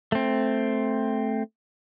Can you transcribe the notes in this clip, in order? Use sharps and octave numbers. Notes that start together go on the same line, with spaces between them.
A3 C4